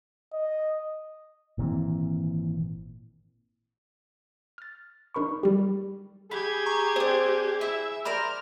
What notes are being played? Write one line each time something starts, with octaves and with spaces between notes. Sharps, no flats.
D#5
G#1 A#2 E3 C4
F6 A6
D4 D#4 A#4 B5 C#6
G3 G4
G4 G#4 B5 G#6
A#5 C#6
C4 D4 C5
E4 E5
A#4 C5 D5 B5 F6